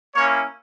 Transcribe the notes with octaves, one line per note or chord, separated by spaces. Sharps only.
A#3 C#4 E4 C#5